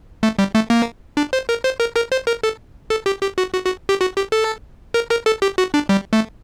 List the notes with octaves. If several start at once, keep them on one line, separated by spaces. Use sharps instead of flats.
A3
G3
A3
A#3
D4
C5
A#4
C5
A#4
A#4
C5
A#4
A4
A4
G4
G4
F#4
F#4
F#4
G4
F#4
G4
A4
A#4
A#4
A4
G4
F#4
D4
G3
A3